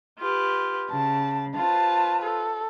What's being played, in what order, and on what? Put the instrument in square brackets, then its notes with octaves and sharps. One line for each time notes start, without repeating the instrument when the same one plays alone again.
[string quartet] F4 G4 B4
[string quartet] C#3 [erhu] A5
[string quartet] F4 B4 C5 [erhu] A5
[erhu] A4